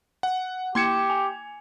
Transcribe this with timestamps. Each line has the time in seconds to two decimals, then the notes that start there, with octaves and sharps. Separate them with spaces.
0.23 F#5
0.75 A#3 G4 C6 G#6 C#7 E7
1.10 G#5